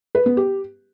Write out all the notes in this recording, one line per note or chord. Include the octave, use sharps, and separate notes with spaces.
B4
B3
G4